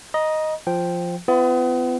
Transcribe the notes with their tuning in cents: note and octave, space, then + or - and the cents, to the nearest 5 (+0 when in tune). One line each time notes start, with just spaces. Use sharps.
D#5 +0 A#5 +30
F3 +0 G5 +0
B3 +35 F4 -40